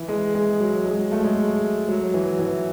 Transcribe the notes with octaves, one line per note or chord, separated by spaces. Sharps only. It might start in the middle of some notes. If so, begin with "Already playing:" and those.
Already playing: E3
G#3
G#3
F#3
G#3
F#3
A3
G#3
F#3
E3
E3